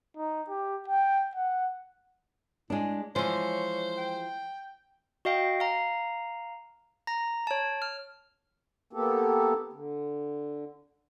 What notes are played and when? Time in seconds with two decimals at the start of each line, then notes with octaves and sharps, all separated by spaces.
0.17 D#4
0.49 G4
0.88 G5
1.35 F#5
2.70 G#3 D4 E4
3.16 E3 F3 G#3 C5 C#5
3.98 G5
5.25 F#4 D#5 F5 G5
5.60 F5 A#5
7.07 A#5 A#6
7.47 C#5 A5
7.82 F6
8.93 A#3 B3 G4 A4
9.73 D3